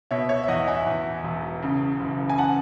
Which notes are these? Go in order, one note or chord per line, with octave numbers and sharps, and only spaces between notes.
B2 C#5 E5
C#5 E5
E5
E2 D#5 F#5
E5 G#5
E2
E1
C#3
F#1
G#5
F#5 A5